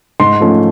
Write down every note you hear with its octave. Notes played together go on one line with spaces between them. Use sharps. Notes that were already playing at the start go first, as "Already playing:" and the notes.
G#2 C6
F3 A3 C#4